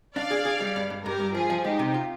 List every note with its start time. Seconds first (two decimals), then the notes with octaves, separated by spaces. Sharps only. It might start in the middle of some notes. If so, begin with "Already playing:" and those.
0.16 D4 D5 F5
0.31 G#4
0.45 G#4
0.61 G3
0.76 G2
0.90 G2
1.05 G2 G4 A#4
1.20 G2
1.34 F3 F4 G#4
1.50 F3
1.65 G#3 D#4 G4
1.79 C3
1.94 F4